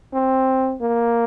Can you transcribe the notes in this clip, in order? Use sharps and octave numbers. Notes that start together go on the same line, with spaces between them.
C4
A#3